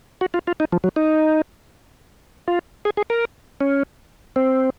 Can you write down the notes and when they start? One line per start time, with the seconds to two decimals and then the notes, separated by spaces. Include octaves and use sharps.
0.21 F#4
0.34 F4
0.47 F4
0.60 D#4
0.72 F3
0.84 F#3
0.96 D#4
2.48 F4
2.85 G#4
2.97 G#4
3.10 A#4
3.61 C#4
4.36 C4